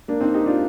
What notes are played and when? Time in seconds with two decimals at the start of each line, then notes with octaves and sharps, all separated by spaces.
0.08 A#3 D4
0.21 C4 D#4
0.34 D#4 G4
0.46 D4 F4